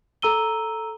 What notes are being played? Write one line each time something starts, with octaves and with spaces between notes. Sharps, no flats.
A4 A#5 E6 D#7 G7